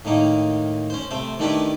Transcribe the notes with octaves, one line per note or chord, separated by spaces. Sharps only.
A2 D#3 A#3 D#4
C#4 C5
C3 A3 C5
D#3 A3 D4 E4 G4 B4